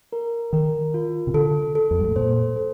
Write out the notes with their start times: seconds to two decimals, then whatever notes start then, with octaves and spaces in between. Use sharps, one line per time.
0.13 A#4
0.53 D#3 A#4
0.94 F4
1.27 C3
1.34 D3 A4
1.75 A4
1.91 F2
1.99 G2
2.08 A2
2.16 A#2 C5
2.56 A4